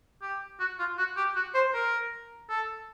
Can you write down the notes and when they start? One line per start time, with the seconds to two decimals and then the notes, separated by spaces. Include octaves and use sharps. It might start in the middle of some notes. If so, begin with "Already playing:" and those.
0.22 G4
0.60 F#4
0.79 F4
0.98 F#4
1.17 G4
1.36 F#4
1.55 C5
1.74 A#4
2.50 A4